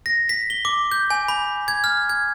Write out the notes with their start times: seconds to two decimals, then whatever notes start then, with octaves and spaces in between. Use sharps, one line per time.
0.06 A#6
0.29 B6
0.50 G7
0.65 D6
0.92 G6
1.10 G#5
1.28 B5
1.68 G#6
1.84 F6
2.09 G#6